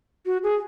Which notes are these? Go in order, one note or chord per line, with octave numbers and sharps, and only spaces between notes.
F#4
G#4